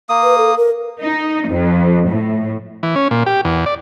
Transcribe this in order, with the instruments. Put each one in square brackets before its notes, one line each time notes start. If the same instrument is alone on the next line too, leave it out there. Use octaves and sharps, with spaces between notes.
[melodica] A#3 D#6
[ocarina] B4
A4
A#4
[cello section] D#4
F2
A2
[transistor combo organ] E3
C#4
A#2
G4
E2
D5